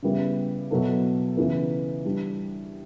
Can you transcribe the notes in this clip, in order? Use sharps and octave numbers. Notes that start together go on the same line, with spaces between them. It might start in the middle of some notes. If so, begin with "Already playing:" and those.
C#3 G3 B3 E4
B2 F#3 B3 E4 A4
C#3 E3 B3
E3 G3 D4